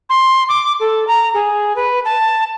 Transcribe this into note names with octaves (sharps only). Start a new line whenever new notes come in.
C6
D6
A4
A#5
G#4
B4
A5